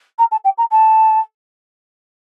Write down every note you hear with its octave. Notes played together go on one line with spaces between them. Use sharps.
A#5
A5
G5
A#5
A5